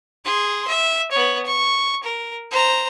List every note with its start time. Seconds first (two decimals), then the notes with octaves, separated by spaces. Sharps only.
0.24 G#4 C6
0.67 E5
1.11 B3 C#5
1.46 C#6
2.03 A#4
2.51 C5 A#5